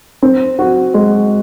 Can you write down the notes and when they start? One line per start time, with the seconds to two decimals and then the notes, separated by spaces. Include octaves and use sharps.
0.22 C4
0.59 F#4
0.94 G#3